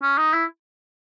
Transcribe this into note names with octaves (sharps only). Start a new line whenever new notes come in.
C#4
D#4
E4